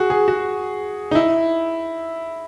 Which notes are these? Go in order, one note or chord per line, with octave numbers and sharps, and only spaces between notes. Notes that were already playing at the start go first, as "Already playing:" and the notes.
Already playing: F#4 G#4
G#4
F#4
D#4
E4